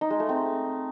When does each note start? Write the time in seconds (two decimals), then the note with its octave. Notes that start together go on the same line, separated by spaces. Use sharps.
0.01 D#4
0.10 G#3
0.20 A3
0.29 C4